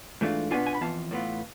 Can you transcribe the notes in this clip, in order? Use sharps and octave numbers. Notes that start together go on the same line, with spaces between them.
G#2 E3 A3 D4 F4
B2 B3 D4 F4 G#5
G#5
B5
F2 E3 B3 F4 A5
A2 E3 B3 F4